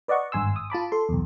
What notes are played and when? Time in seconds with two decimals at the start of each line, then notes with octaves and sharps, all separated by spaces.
0.08 B4 D5 D#5 F#5 C#6
0.32 G#1 G2 G#5 C6 E6
0.56 D#6
0.70 F4 A5 B5 D6
0.92 A4 C6
1.09 B1 E2